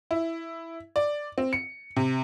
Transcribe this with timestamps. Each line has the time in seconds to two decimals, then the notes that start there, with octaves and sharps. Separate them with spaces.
0.11 E4
0.96 D5
1.38 C4
1.53 C#7
1.96 C3